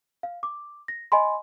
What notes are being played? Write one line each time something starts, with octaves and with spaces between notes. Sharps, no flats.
F5
D6
A#6
D#5 G#5 B5 C6